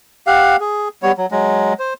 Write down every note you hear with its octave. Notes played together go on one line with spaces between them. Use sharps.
G4 F5 F#5
G#4
G3 B3 C#5
F#3
F#3 G#3
C5